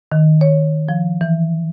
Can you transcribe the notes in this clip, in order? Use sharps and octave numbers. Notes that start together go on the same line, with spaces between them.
D#3
C#5
F3
E3